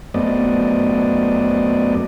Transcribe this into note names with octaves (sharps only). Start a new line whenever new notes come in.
F#2 A3 B3 C4 D5 D#5